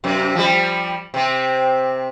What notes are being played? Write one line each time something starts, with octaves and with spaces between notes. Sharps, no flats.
F#2 C3
F3 G3
C3 C4